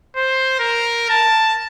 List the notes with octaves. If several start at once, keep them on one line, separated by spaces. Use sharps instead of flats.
C5
A#4
A5